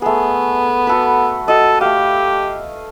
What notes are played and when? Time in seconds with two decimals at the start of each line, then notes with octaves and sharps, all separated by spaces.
0.02 A3 B3 G#4
0.87 F#4 A4 B4
1.48 F#4 A4 D#5
1.81 A3 G4 F5